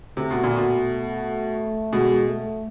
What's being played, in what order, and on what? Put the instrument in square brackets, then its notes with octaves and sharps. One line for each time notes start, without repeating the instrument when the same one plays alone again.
[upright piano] C3 [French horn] A3
[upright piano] B2
A#2
B2
[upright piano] B2 [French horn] G#3
[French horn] A3